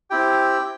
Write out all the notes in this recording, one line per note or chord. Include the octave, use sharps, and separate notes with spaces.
C4 E4 G4 G5